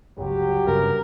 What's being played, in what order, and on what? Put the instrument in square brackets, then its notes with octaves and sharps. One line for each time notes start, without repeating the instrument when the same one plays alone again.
[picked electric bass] G1 C#2 [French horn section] F#3 G4
[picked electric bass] G1 G2 C#3 [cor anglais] A#4